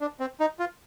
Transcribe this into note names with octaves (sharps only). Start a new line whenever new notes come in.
D4
C4
D#4
F4